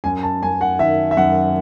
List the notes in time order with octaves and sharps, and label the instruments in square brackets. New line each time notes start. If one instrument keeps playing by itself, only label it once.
[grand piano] F#2 [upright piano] G#5
[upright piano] A5
[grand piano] F#2 [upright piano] G#5
[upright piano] F#5
[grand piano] D#3 [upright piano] E5
[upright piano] E5
[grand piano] F#2 [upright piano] F#5